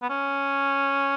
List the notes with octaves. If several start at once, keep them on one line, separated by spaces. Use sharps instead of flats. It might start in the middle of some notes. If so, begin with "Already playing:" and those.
B3
C#4